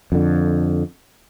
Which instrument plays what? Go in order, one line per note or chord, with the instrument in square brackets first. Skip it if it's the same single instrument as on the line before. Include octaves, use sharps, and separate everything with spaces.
[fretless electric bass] F2 D3